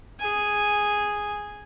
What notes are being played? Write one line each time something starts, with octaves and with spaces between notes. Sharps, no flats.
G#4 G#5